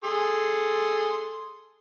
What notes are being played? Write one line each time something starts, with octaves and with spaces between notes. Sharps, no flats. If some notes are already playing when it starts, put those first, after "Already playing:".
G#4 A4 C6